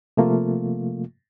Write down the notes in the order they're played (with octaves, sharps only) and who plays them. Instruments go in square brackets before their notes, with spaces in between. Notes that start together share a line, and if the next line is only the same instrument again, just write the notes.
[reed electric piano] C3 F3 A3 A#3 F4